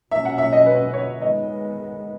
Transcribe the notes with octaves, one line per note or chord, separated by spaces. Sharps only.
B2 F#3 C#4 E5
F#5
E5
D#5
B4
C#5
D#3 G#3 B3 D#5